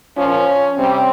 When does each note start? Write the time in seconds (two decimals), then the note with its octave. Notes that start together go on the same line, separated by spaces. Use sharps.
0.18 A#2 F3 C#4
0.78 C3 G3 C4